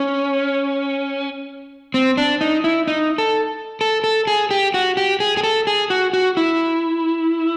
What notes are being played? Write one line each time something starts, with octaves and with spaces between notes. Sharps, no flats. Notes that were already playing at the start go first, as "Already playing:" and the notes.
Already playing: C#4
C4
D4
D#4
E4
D#4
A4
A4
A4
G#4
G4
F#4
G4
G#4
G#4
A4
G#4
F#4
F#4
E4